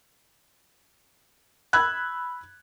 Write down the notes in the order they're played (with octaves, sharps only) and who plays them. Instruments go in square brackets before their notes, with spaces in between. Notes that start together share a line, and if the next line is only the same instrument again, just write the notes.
[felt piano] B5 E6 F#6 G#6